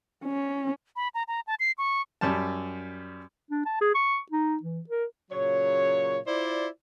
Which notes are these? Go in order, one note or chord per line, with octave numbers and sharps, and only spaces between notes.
C#4
B5
A#5
A#5
A5
C7
C#6
F#2 G3 A5
D4
A5
G#4
C#6
D#4
E3
A#4
A#2 C#3 F#3 C#5
E4 F4 C5 D5